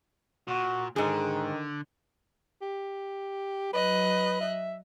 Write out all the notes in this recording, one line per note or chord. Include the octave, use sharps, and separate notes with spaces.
A#2 F#4
G#2 D3 D#3 G#4
G4
F#3 B4 D#5 F#6
E5